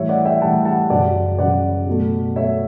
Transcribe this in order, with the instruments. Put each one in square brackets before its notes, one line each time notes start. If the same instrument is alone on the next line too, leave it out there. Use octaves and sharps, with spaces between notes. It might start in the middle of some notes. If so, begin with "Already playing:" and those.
Already playing: [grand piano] A2 E3 G3 C#5 E5
D5 F#5
E5 G5
A2 E3 G3 F#5 A5
F#5 A5
F#2 C#3 F#3 D5 F#5
F#2 C#3 F#3 D5 F#5
B2 F#3 A3
B2 F#3 A3 C#5 E5